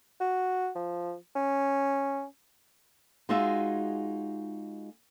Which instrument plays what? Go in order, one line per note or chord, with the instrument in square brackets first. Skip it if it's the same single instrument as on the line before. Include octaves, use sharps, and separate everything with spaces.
[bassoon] F#4
F3
C#4
[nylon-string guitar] G#3 D#4 F4 F#4 G#4 E5